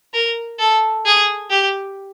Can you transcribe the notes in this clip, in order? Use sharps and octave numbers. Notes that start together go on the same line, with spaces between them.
A#4
A4
G#4
G4